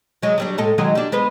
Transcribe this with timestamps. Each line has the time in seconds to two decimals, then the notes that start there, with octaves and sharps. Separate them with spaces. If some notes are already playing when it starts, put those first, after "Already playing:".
0.22 F#3 G#3
0.38 F#3 G3 D4
0.58 A2 G#3 A4
0.78 D#3 F#3 G#3
0.95 G3 D4
1.12 G#3 B3 B4